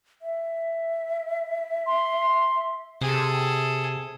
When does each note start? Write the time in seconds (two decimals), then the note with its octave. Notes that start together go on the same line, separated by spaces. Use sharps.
0.22 E5
1.87 C6
3.01 C3 G#4 A4